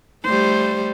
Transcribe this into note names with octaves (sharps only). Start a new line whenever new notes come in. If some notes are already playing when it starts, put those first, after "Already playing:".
G3 A3 C5